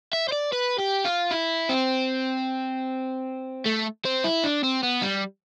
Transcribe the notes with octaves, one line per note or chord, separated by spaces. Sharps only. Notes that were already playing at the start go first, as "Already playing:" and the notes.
E5
C5
D5
B4
G4
F4
E4
C4
A3
C4
E4
D4
C4
B3
G3